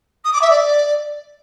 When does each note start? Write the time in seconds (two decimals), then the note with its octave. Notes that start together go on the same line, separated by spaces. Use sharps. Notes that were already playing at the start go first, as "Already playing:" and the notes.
0.24 D#6
0.33 D6
0.41 E5
0.50 D5